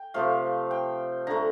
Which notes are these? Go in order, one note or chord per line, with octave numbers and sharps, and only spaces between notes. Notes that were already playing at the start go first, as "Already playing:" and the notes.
Already playing: G5
C3 F3 A3 F5
G5
D3 A3 A#5